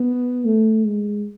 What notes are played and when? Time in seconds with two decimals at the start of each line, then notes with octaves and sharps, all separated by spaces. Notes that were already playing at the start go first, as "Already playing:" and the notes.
Already playing: B3
0.45 A3
0.85 G#3